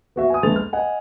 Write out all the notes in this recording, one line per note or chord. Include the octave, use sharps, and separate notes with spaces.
B3 F#4 E5
G#5 D#6
A#1 G#3 A3 B3 A6 F7
F6
D#5 F#5 G#5